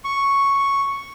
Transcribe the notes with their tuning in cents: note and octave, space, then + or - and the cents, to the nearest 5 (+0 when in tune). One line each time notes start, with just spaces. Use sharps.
C#6 +0